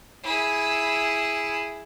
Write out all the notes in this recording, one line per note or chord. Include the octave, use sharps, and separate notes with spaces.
E4 G#4